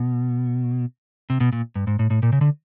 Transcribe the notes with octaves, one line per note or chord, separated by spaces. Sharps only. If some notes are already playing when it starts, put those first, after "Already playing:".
Already playing: B2
C3
B2
A#2
G2
G#2
A2
A2
A#2
C#3
D3